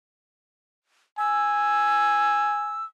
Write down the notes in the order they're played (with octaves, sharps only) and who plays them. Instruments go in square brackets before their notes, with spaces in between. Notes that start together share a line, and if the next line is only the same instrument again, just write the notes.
[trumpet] G#5 [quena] E6